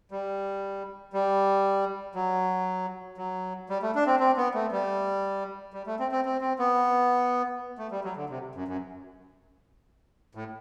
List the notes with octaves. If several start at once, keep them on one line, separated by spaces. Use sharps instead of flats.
G3
G3
F#3
F#3
G3
A3
D4
C4
C4
B3
A3
G3
G3
A3
C4
C4
C4
C4
B3
A3
G3
F#3
D3
C3
F#2
F#2
A2